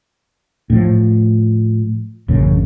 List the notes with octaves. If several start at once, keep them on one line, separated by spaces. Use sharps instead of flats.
A2 F3
A1 F#2 C#3